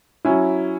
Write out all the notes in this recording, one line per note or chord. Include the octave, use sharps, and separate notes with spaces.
F#3 C#4 E4